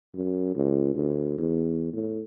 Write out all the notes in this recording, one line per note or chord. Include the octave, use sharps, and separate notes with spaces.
F#2
C#2
D2
E2
A2